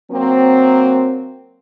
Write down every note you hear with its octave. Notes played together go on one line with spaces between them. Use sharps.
F#3 A#3 C4